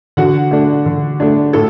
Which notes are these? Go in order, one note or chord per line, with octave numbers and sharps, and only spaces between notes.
D3 F#4 F#5
A3 D4
D3
A3 D4
A2 A4